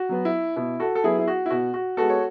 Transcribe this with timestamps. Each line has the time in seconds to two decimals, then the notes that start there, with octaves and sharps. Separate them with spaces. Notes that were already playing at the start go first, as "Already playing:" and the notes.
Already playing: F#4
0.09 F#3 B3
0.25 E4
0.56 B2 E4
0.80 F#4 A4
0.95 A4
1.04 F#3 B3 E4 G#4
1.18 E4
1.28 F#4
1.46 E4
1.51 B2 F#4
1.74 F#4
1.97 G#3 B3 F#4 A4
2.09 C#5